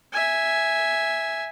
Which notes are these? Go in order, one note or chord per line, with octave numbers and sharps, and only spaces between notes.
E5 G#5